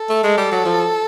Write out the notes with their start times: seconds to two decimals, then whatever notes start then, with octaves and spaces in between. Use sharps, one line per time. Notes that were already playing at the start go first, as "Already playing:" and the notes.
Already playing: A4
0.10 A3
0.23 G#3
0.38 G3
0.52 F#3
0.65 F3